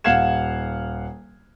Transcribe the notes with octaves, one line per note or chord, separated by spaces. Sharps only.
D#1 F5 F#5 G#6 E7